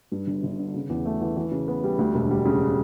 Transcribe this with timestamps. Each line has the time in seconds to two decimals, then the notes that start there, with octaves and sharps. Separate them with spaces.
0.12 G2
0.27 G1
0.43 G1
0.59 D3
0.74 C#3
0.90 E2
1.06 A3
1.21 E3
1.37 E3
1.51 C#3
1.68 B3
1.84 G3
1.99 D2
2.14 E1
2.30 G3
2.45 C#3